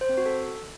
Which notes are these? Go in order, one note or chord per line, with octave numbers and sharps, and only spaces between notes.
C5
C4
F#4
A4